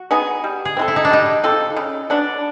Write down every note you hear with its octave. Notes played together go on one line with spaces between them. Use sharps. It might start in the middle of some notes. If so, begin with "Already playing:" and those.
Already playing: F#4
B3 D#4 G#4
G3
G#4
C4 F4 A4
E4
D#4
D4
G3 D#4
C4 F4 A4
C#3
F#3 B3 D4